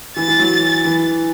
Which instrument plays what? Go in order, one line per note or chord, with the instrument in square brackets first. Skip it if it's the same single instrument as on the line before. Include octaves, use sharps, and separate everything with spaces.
[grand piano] E3 [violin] A6
[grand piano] E3
F#3
E3